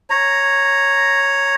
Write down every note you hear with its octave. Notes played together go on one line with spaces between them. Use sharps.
C#5 A#5